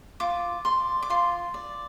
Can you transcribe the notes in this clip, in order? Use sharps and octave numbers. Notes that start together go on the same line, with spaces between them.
F4 D6
D5 C6
D6
F4 C6
D5